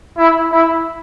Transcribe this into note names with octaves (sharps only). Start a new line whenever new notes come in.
E4
E4